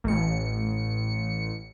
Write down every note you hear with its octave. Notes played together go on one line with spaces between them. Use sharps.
A1 C#7